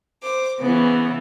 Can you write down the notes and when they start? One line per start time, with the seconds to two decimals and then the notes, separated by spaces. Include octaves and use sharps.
0.22 C5 D6
0.60 C#3 E3 B3